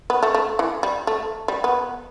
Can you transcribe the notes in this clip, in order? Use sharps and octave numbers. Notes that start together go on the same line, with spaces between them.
B3
A3
A3
E3
G3
A3
G3
B3